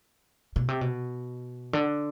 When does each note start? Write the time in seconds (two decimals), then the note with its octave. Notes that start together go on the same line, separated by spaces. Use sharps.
0.56 B2
0.68 C3
0.81 B2
1.73 D3